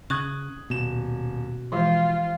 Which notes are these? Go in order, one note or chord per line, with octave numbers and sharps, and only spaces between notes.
C#3 C#6 D#6 F#6 G#6
D#1 B2 E7
E3 F3 G#3 F4 G4 C5